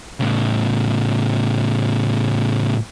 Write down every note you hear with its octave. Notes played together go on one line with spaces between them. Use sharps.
A2 C#3